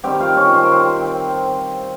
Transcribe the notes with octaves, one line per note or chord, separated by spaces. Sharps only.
D#3 G3 C4 G4 G5
F4 F5
C#4 C#5
C4 C5
A#4
C4 C5